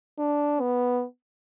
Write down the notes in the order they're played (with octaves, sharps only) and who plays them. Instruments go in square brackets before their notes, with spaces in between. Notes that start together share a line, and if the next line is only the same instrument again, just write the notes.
[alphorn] D4
B3